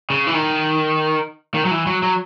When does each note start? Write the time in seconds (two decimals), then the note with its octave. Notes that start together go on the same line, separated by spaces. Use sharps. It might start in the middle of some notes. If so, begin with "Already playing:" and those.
0.10 C#3
0.27 E3
0.34 D#3
1.54 D#3
1.65 F#3
1.71 E3
1.87 F#3
2.03 F#3